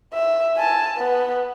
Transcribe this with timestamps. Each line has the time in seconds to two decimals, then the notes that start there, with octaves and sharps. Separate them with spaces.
0.14 E5
0.57 G#5 A5
0.97 B3